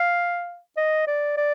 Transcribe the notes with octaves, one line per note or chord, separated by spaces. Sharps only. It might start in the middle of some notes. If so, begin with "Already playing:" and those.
Already playing: F5
D#5
D5
D5